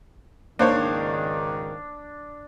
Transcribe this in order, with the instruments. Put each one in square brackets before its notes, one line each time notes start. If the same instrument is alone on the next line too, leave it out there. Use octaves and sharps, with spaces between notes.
[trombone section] C#2 G#2 D#3 [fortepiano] A#3 C5 C#5 [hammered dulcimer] D4